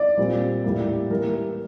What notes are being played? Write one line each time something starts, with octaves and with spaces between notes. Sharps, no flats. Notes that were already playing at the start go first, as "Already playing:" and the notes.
Already playing: D5
A#2 G3 C4
A2 G3 A#3
E3 G3 A#3 A#4